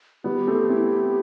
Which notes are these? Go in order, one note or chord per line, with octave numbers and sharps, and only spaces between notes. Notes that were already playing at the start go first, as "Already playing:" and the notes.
G3 B3 G4
A3 C4
C4 E4